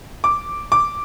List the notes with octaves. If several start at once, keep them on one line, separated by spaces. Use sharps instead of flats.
D6
D6